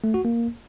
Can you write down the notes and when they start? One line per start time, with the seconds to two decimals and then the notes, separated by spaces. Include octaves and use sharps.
0.04 A3
0.14 F#4
0.25 A#3